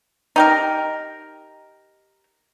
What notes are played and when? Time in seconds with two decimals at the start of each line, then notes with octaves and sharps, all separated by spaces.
0.36 D#4 G4 A#4